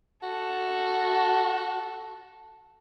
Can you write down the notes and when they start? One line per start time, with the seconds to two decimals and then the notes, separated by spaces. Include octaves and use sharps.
0.23 F#4 A4